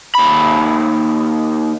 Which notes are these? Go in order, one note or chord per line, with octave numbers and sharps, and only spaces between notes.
D#2 B5